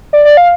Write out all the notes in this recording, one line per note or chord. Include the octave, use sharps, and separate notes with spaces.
D5
D5
F5